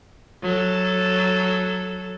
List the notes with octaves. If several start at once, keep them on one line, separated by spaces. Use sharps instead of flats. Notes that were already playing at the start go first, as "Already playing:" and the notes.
F#3 A4